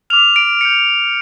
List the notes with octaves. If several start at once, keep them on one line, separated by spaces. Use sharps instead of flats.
D6 F6 F7
D7
D6 G6 C#7